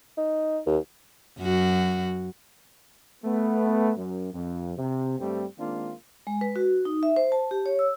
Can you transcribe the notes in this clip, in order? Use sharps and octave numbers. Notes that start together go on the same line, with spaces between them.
D#4
D#2
F#2 F#4
A3 B3
F#2
F2
C3
G2 G3 A3 C4
D#3 G#3 A#3 C4 D4 F4
G#3
B4
F#4
D#4
E5
C5
A5
G4
C#5
E6